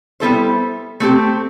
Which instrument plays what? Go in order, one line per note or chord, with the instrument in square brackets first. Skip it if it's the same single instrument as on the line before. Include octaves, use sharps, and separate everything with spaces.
[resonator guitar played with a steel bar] G3 B3 E4 A4 C5
A3 C4 G4